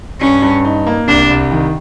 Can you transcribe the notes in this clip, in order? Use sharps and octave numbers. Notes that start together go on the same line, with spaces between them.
G2 C#4
G2
D#4
A#3
C2 D4
C2
D#3